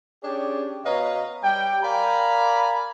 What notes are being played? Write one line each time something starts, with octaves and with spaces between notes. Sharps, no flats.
C#4 D4 G4 G#4 C#5 D5
B2 B4 C#5 D#5 F5 A#5
G3 G5
A#4 D5 F5 G#5 A#5 B5